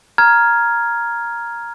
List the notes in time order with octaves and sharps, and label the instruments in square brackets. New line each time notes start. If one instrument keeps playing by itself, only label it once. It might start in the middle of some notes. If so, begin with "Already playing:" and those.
[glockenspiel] A#5 F6 G#6